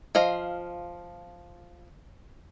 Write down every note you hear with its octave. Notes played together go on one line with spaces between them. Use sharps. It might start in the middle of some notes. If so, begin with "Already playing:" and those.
F3 D#5 F5